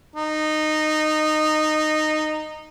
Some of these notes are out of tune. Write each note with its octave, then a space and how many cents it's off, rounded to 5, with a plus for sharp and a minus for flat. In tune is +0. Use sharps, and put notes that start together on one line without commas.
D#4 -15